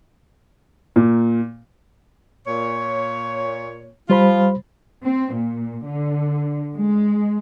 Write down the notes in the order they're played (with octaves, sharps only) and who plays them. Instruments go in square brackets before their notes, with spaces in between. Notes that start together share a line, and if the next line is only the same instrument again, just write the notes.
[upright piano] A#2
[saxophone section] A#2 C#5
[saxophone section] F3 F4 [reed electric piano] G3 C5 B5
[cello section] C4
A#2
D3
G#3